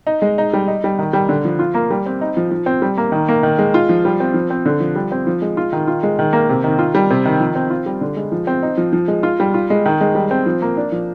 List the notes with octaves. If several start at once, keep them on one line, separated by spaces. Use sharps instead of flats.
D#4
G#3
D#4
G3
D#4
G3
D#3
G3
D3
F3
F4
A#3
G3
C4
D#4
F3
F3
C4
G3
A#3
D#3
A#3
D#3
G#3
F4
F3
G3
C4
F3
C4
D3
F3
G3
C4
F3
G#3
F4
D#3
F4
G#3
D#3
A#3
C3
D#3
F4
G3
C3
D#3
F3
C4
F4
G3
D3
G#3
F3
C4
D#4
F3
F3
G#3
F4
G3
F4
G#3
D#3
G#3
G3
C4
F3
A#3
D4
F3